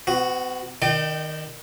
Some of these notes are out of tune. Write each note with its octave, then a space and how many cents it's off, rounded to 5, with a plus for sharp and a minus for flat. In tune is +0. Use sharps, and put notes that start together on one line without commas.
B3 +45 F#4 +0
D#3 +0 D5 +35 G5 -20